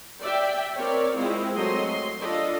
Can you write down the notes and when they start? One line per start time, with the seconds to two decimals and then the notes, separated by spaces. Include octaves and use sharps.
0.21 D5 E5 G5
0.77 C4 A#4 C#5 D5
1.17 G#3 C4 E4 F4
1.53 F#3 A3 C4 D#5 C6
1.86 C6
2.21 D4 F4 A4 D5 D#5